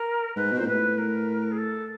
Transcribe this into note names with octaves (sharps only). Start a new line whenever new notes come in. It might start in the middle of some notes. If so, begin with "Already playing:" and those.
Already playing: A#4
G#2 B4
B2
A#2 C5
A2 B4
A#4
G#4
A4